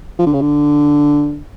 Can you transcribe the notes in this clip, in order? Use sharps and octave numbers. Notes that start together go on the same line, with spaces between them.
F3
D3
C#3
D3